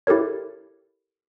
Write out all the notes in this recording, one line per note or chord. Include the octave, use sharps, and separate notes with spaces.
E4 G4 A4 A#4 C#5